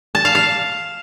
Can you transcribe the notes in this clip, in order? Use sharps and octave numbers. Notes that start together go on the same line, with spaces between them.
A5
F5
F5